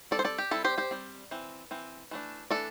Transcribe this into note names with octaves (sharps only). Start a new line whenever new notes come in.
G3 C4 A4 D5
C5
A4 D5
G4
G3 C4 E4 A4
G4 C5
G4 C5
G3 C4
E3 C4
E3 C4
E3 A3 D4
E3 A3 D4 A4 D5